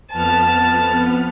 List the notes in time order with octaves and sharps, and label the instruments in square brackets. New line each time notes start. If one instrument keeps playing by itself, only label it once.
[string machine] F2 B3 F6 [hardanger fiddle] A5